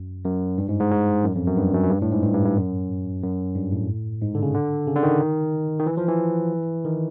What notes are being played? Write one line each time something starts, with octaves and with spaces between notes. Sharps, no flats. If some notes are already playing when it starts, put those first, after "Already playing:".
Already playing: F#2
F#2
G2
G#2
G#2
G#2
F#2
F2
F#2
G2
F#2
F#2
G2
A2
G#2
G2
G2
G2
F#2
F#2
G2
A2
G#2
D3
C#3
D3
C#3
D3
D#3
D#3
E3
F3
E3
D#3